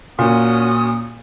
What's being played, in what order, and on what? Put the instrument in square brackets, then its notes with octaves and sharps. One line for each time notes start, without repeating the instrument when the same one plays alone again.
[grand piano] A#2 [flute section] C#4 F#4 D#6